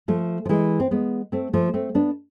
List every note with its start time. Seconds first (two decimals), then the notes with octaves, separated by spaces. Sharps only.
0.08 F3 A3
0.45 F3
0.49 E3 G#3
0.80 C4
0.91 G#3 B3
1.32 A3 C4
1.54 F3 A3
1.74 A3 C4
1.95 B3 D4